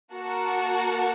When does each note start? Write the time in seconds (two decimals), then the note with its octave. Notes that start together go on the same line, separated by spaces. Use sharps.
0.12 A#3 F#4 A#4 F#5 A5